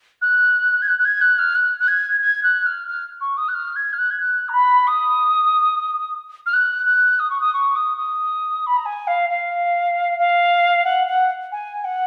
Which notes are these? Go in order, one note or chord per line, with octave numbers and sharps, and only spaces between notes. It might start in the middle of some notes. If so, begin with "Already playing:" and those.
F#6
G#6
F#6
F#6
G#6
F#6
F6
F#6
F#6
G#6
G#6
F#6
F6
F6
C#6
D#6
F#6
F6
G#6
F6
F#6
G#6
F#6
A#5
B5
D#6
F6
F#6
F#6
D#6
C#6
D#6
C#6
D#6
D#6
B5
A#5
G#5
F5
F5
F5
F#5
F#5
G#5
F#5